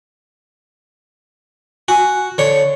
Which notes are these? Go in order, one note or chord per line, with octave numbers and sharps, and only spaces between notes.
F#4 G#5
D3 C#5